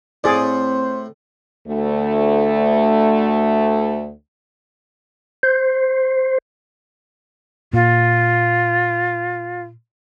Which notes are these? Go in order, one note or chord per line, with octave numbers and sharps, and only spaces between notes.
A2 C4 G#4 C5 D5
D2 A3
C5
A#2 F4